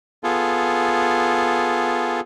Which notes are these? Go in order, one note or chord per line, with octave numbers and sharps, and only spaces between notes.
B3 F4 G#4 A4